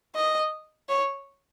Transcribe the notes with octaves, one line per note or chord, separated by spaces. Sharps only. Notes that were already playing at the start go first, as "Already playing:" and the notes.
D#5
C#5